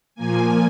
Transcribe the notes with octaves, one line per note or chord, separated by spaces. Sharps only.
A#2 F3 A#3 G#5